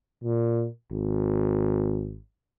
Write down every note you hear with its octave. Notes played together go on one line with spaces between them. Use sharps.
A#2
G#1